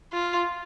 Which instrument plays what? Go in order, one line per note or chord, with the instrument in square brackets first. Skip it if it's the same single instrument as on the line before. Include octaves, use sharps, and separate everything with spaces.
[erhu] F4